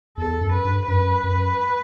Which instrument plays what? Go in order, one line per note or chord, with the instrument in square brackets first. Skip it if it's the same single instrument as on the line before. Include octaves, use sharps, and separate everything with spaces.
[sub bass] E2 [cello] A4
[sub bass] F#2
[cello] B4
[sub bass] G2
[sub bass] F#2 [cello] B4
[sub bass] F#2